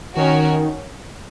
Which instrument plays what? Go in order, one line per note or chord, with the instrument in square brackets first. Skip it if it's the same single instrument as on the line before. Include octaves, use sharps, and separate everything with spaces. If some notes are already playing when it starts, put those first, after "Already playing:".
[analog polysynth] D#3 [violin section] C#4 F#4 A#4 C#5